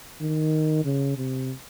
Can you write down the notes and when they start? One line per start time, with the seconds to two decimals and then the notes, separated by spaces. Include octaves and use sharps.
0.21 D#3
0.85 C#3
1.17 C3